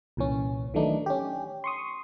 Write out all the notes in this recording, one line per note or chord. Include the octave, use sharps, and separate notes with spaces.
C2 A#2 E3 C#4
D#3 E3 F#3 A3 D4 D#4
C#4 G4
C6 C#6 D#6